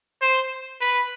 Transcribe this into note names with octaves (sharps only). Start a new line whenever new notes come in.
C5
B4